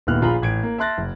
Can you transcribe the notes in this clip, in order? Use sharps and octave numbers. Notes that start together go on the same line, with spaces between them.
D#1 D#2 B3 E4 F6 F#6
A#1 F4 G#4 A#5 B5 F#7
A1 G#6 D7
A#3
E5 A5 C6 F#6 A6 A#6
F#1